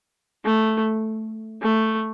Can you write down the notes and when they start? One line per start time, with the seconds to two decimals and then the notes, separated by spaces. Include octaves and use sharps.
0.45 A3
1.62 A3